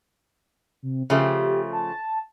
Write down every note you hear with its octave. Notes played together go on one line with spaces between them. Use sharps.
C3
C#3 F3 A3 G4
A5